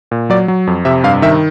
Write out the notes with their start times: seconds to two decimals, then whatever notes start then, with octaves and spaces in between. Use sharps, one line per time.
0.11 A#2
0.30 F#3 D5
0.48 F#3
0.67 F2
0.85 C3 E5
1.04 G2 F5
1.22 D#3 E5